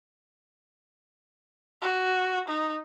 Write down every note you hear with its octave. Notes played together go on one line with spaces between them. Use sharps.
F#4
D#4